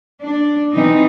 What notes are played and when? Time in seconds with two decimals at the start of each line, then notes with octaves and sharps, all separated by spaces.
0.21 D4
0.73 B2 E3 C4 D#4